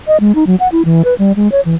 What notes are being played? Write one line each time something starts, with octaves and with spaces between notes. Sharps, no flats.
D#5
G#3
D#4
F#3
F#5
E4
E3
B4
G3
G#3
C#5
E3